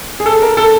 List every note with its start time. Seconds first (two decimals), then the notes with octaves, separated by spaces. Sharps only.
0.20 G#4
0.26 A4
0.42 A#4
0.57 A4